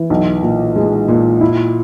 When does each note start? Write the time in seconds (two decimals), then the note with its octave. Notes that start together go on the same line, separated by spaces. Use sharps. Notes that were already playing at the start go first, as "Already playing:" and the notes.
Already playing: E3
0.10 B1
0.43 A#2
0.76 G#3
1.08 A#2
1.41 E4